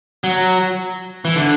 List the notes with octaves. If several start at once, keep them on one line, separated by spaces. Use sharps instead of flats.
F#3
E3
D3